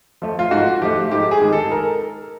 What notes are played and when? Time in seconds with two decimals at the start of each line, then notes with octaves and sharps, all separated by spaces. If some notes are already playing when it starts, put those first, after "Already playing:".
0.22 F3 A3
0.39 F4
0.51 G#2 F#4
0.82 F3 A3 G4
1.11 G#2 G4
1.31 G#4
1.41 D#3 G#3
1.52 A4
1.72 A#4